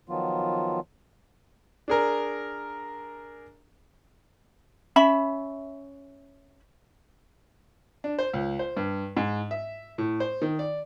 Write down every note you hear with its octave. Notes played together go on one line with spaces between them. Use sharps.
D#3 F3 F#3 B3 F4
D4 G#4 A#4
C#4 E5 B5
D4
C5
C#2
C5
G2
G#2
E5
A2
C5
D#3
D5